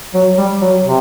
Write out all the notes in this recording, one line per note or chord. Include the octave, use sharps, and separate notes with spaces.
F#3
G3
F#3
C3